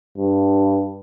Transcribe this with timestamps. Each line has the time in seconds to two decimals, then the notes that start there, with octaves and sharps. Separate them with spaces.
0.18 G2